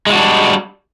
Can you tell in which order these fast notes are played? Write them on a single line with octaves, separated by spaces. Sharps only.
G#3 E4 F#4 D4 G3